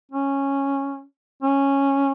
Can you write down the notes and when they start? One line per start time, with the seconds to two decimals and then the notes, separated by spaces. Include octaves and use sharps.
0.11 C#4
1.42 C#4